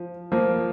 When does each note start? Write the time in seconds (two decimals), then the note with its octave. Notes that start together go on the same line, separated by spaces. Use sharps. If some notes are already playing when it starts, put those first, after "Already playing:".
Already playing: F3
0.32 F3 A#3